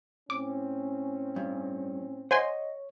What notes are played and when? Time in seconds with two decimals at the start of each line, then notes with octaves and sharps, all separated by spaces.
0.30 A2 C4 C#4 D6
1.36 G2
2.31 C5 C#5 D#5 F#5 G#5 C6